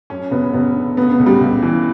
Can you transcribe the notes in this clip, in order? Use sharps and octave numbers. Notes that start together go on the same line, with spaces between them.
F#2 C#4
F#1 B3
F#1 B3
D3
C#3 B3
B3
C#2
G3
C#2
E3